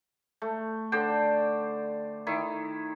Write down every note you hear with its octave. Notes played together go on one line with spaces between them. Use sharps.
A3
D3 D4 C5 G5
D#3 E4